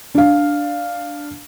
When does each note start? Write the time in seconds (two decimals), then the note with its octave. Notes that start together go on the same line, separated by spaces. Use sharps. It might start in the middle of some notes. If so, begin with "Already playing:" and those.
0.15 D4 F5